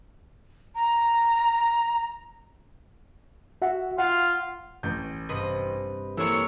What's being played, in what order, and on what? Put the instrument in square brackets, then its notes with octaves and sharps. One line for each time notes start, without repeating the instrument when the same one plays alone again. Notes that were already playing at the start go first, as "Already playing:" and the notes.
[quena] A#5
[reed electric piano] F#4 E5 F#5
[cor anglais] F4 [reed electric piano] F#5
[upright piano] A1 G6
[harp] G2 C3 [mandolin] B4 D#5 C6
[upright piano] E3 [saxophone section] A#3 A4 C#5 [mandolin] E4 C5 C#6